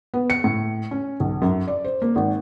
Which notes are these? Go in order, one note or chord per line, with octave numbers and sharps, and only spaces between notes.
B3
C#7
A2
C#4
B1
F#2
D5
C5
A#3
G#1